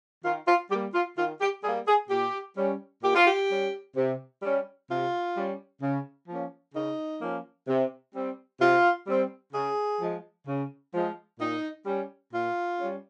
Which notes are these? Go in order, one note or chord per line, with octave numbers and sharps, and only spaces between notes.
D#3 F4
F4
G3 A#3 G4
F4
D#3 F4
G4
G3 A#3 G#4
G#4
A#2 G4
G3 C#4
A#2 G4
F4
G4
G3 C#4
C3
G3 C#4
C3 F4
G3 C#4
C#3
F3 A#3 C#4
C#3 D#4
F3 A#3 C#4
C3
G3 C4
C3 F4
G3 C4
C#3 G#4
F3 G#3
C#3
F3 G#3
A#2 D#4
G3 C#4
A#2 F4
G3 C#4